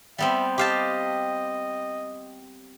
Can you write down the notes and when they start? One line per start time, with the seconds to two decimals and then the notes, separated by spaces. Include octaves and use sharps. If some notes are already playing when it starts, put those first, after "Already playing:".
0.18 G3 B3 C4 E5
0.58 G4 D#5 F5 A5